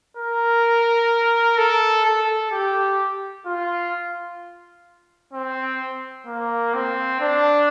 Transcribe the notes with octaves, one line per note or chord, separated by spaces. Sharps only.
A#4
A4
A4
G4
F4
C4
A#3
C4
D4